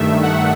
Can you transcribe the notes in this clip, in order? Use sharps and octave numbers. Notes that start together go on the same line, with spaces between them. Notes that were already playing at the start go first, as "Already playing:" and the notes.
Already playing: G2 D#3 A3 E5
F#5